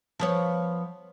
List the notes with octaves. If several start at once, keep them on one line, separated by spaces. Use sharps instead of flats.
F3 B3 C#5